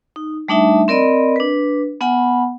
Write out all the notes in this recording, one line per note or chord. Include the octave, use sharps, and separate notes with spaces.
D#4
G3 A3 D4 D#4 E5 A5
C4 A#4 D5 D#5 B5
D4 B4
B3 F#5 G#5 B5